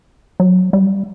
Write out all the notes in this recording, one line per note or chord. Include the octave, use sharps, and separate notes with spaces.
F#3
G3